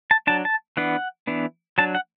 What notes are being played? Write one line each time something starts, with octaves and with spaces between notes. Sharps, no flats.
A5
F#3 D4 A5
A5
E3 B3 D4 F#5
E3 B3 D4
F#3 D4 A5
F#5